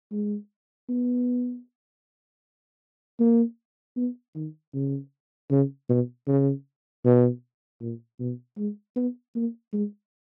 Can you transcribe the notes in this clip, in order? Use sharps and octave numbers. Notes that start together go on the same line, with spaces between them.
G#3
B3
A#3
B3
D#3
C#3
C#3
B2
C#3
B2
A#2
B2
G#3
B3
A#3
G#3